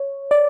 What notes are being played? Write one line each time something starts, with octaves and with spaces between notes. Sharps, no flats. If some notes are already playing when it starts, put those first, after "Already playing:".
Already playing: C#5
D5